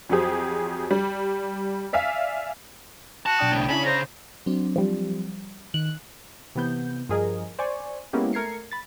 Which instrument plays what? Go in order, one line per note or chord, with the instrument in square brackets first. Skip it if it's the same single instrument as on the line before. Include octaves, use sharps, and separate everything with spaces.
[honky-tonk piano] F2 F#3 G4 G#4 C5
G3
D5 E5 F5 G#5 B6
[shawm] F#4 [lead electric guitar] A5
[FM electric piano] B1 D4 D#6 [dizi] G5
[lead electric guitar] A2 C#3
[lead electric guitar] C#3 [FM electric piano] C#4 D4 E4 [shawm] B5
[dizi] C5 [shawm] A#5
[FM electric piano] F#3 C4 D4
[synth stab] F3 G3
[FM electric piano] D#3 [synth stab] F#6
[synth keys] C3 E3 B3 G6
G2 F3 G#4 A#4 D#5
C5 D5 G#5 C#6
G#3 A#3 B3 C#4 E4 G4
A3 A#4 G#6 C7 C#7
B5 A6